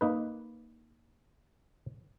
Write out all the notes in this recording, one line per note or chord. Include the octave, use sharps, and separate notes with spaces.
A#3 D#4 B4